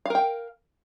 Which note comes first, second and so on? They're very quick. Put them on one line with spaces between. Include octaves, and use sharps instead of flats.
F5 A#4 G5